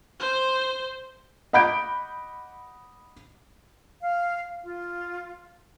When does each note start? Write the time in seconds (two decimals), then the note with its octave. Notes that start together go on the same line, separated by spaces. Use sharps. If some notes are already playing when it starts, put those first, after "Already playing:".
0.20 C5
1.53 D#5 F#5 B5 D6 G6 D7
4.01 F5
4.63 F4